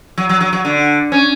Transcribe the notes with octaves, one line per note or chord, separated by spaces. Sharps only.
F#3
F#3
F#3
F#3
D3
C#4